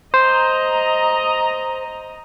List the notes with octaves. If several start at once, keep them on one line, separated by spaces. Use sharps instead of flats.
C5 D#5 A#5